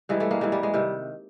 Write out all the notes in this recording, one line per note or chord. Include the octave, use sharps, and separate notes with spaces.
G2 E3 G3 G#3
G3 A3
G#3 A#3
G2 E3 G3 G#3
G3
G#3
C3 D#3 G3